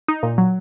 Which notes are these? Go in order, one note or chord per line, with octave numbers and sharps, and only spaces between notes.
D#4
A#2
F#3